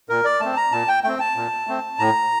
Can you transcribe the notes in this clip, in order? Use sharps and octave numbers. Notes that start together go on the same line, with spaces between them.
A#2 A#4
D5
A3 C4 A5
A#5
A#2 A5
G5
A3 C4 G5
A5
A#2
A3 C4
A2 A#5